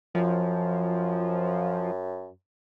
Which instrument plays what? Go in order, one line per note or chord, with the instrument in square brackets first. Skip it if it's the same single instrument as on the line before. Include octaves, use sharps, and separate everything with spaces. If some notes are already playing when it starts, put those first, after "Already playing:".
[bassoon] F#2 [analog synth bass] F3